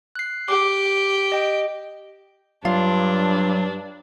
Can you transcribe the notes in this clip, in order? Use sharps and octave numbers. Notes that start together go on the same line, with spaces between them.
F#6 C7
G4 D6
D#5 G5
G2 F#3 D4 F4